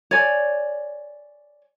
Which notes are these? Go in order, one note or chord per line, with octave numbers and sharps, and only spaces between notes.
C#5 D5 G#5